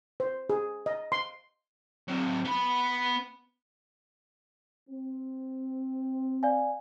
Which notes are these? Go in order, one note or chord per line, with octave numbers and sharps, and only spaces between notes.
C5
G#4
D#5
C6
F#3 C4
B3 B5
C4
D5 F5 G#5